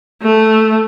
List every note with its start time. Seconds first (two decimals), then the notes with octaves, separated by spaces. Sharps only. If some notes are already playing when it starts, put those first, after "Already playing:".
0.22 A3